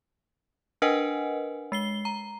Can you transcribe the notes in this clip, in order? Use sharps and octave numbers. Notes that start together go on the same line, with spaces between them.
D4 A#4 B4 D#5 F#5 G#5
G#3 C7 G7
A#5